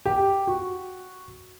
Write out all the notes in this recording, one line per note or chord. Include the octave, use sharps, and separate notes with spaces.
G4
F#4